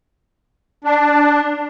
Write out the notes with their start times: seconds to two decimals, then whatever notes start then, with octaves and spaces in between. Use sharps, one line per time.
0.84 D4